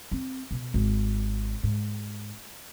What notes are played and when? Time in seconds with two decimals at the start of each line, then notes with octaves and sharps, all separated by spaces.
0.11 C4
0.51 B2
0.74 G#1
1.63 G#2